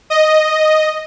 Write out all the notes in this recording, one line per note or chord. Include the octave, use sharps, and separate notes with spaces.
D#5